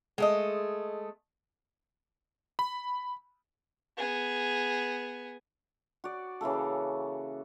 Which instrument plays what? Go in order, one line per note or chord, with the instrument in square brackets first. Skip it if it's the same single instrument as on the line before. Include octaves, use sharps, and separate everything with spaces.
[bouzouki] G#3 A3 D#5
[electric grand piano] B5
[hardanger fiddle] B3 G#4
[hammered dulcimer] F#4 D5
C#3 E3 A#3 A4